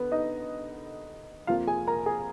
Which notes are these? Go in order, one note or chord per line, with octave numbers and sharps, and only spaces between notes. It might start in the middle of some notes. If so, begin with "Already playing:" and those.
Already playing: D3 B3 B4
D#4 D#5
F2 F3 A#3 F4 F5
G#4 G#5
A#4 A#5
G#4 G#5